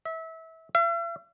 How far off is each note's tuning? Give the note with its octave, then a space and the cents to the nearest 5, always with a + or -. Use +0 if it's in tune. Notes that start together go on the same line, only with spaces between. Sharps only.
E5 -25
E5 +45